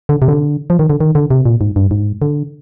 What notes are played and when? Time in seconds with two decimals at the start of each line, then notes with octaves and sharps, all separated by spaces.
0.09 D3
0.22 C3
0.28 D3
0.70 F3
0.79 D#3
0.90 D3
1.01 D#3
1.15 D3
1.31 C3
1.46 A#2
1.61 G#2
1.76 G2
1.91 G#2
2.22 D3